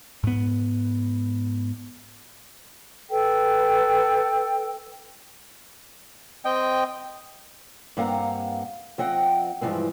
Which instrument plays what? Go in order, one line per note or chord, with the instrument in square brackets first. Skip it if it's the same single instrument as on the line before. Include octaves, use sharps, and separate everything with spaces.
[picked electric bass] G#2 B3
[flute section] A4 B4 G5
[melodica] C4 D#5 G5
[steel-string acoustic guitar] G2 A#3 C4 F5 F#5 A#5
F3 C4 D#5 F#5 G5
G2 E3 F3 G#3 C4